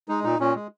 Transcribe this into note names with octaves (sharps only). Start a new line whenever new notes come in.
G#3 D#4
A#2 D#4
A#2 C#4
G#3